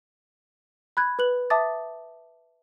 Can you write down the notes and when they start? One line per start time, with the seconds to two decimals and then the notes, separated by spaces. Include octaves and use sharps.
0.97 B5 F#6 G#6
1.19 B4 F#6 F#7
1.50 E5 A5 D6 D#6 A6